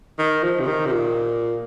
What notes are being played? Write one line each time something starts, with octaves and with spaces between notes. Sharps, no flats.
D#3
F3
C3
D#3
C3
A#2